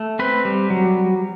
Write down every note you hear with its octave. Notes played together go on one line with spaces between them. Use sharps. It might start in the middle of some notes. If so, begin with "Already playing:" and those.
Already playing: A3
C4 B4
G3
F#3